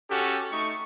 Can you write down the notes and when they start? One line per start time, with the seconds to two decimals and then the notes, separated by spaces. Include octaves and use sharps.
0.10 C#4 F#4 G4 A4
0.51 A3 D#4 C#6